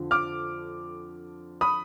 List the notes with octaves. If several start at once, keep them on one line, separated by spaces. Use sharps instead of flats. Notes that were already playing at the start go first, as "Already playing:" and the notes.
Already playing: F2 D3 F3
D6 F6
B5 D#6